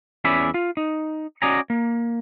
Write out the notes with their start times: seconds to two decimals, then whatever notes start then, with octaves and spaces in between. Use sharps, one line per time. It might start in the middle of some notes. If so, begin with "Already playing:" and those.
0.24 E2 C#4 D5 E5 G#5 B5
0.54 F4
0.77 D#4
1.42 C#4 F#4 D5 D#5 G#5 A#5
1.70 A#3